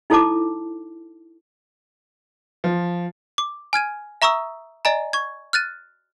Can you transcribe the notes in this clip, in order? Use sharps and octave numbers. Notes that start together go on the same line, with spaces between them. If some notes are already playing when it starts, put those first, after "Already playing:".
D#4 E4 A4 C5 A5 D6
F3
D6
G#5 F6 G#6 D#7
E5 A#5 C#6 D#6 E6
D5 D#5 G#5 A#5
C#6 G#6
F6 F#6 A6 D#7